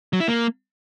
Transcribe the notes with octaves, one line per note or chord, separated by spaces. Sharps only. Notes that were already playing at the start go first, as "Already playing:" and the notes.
F#3
E4
A#3